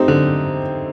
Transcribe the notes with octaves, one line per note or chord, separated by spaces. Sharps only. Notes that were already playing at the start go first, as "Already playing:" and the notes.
Already playing: A3 C4 D#4 G4
D3